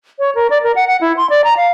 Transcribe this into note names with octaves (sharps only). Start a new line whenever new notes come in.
C#5
A#4
D5
A#4
F#5
F#5
E4
C6
D5
A#5
F5